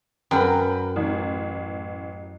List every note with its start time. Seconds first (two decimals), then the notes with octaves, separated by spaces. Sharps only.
0.31 F#2 A#4 B4 G5
0.96 A1